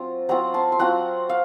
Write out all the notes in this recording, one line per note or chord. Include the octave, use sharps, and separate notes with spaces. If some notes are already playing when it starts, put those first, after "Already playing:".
Already playing: F#3 C4 F4 A#5
F#3 C4 F4 F#5 A#5
A5 C6
C6
F#3 C4 F4 F#5 A#5
F5